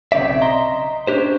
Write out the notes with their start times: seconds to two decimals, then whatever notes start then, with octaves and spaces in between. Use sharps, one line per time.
0.12 B1 C#3 C4 D5 E5
0.42 D#5 A#5 C6
1.07 C#4 D4 G4 C5